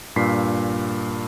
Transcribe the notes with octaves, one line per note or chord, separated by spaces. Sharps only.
G2 A#2 B6 C7